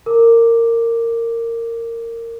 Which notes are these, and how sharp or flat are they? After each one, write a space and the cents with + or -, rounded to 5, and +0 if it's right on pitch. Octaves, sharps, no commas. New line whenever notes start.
A#4 -20 D6 +5